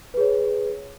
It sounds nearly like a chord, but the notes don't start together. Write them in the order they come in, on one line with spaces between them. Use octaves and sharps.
B4 G#4 C#5